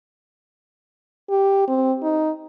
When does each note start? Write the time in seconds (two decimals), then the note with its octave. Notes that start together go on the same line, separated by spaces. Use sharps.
1.30 G4
1.68 C4
2.03 D#4